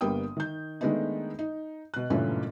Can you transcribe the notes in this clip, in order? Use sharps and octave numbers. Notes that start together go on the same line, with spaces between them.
G1 G3 A#3 B3 G5 D#6
D#3 G6
D#3 G#3 A3 B3 D4 D#4
D#4
B2 F#6
F#1 G2 A#2 E3 A3 C#4